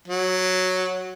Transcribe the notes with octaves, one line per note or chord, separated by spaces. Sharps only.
F#3